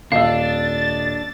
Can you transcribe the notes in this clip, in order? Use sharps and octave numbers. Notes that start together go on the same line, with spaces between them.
D#1 D4 D#5 F5 E6 A6